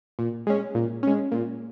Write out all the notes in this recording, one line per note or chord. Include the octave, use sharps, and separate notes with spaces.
A#2
G#3 C#4
A#2
G#3 C#4
A#2